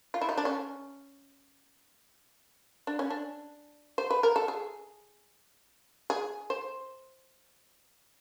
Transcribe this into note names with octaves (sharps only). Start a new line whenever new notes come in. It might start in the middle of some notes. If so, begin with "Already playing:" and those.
F4
E4
D#4
D4
C#4
D4
C#4
D4
C5
B4
A#4
A4
G#4
G#4
C5